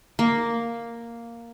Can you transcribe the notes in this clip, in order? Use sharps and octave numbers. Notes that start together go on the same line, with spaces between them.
A#3